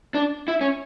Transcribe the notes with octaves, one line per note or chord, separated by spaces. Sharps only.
D4
E4
C#4